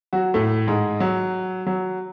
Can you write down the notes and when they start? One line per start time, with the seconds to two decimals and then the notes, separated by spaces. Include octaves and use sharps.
0.13 F#3 F#4
0.34 A2 A3
0.67 G#2 G#3
1.00 F#3
1.67 F#3